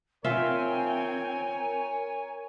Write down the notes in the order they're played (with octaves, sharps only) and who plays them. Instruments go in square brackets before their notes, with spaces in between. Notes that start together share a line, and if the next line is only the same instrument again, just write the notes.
[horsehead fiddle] C4 G5 [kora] F4 E5 [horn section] A#4 C#5 [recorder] G#5